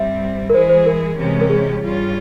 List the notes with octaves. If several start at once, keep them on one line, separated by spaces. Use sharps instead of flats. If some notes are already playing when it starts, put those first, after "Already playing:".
Already playing: G2 G3 C4 E5
A#4
E3 G#3 E4 G#4 C5
C5
A#4
C3 E3 G#3 C#4 G4
A#4
G#4
G2 G3 C#4 F4